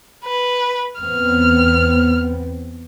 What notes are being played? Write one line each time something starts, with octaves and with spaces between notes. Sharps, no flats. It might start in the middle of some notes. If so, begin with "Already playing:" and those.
B4
E2 B3 C4 F6